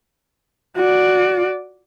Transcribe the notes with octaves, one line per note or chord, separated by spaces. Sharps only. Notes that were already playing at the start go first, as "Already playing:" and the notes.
F#4 D5